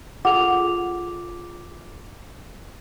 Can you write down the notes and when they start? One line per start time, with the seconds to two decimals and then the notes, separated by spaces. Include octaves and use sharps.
0.25 F4 G#4 A4 F#5 D6 F7